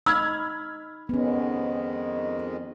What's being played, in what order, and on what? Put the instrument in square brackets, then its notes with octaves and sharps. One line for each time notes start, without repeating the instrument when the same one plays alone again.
[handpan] D#4 [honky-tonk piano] B5 F6 G#6 [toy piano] E6
[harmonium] F2 D#3 G#3 [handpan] B3 C#4